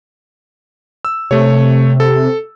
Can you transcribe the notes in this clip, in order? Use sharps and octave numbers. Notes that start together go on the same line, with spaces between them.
E6
C3 A3 C#5
A4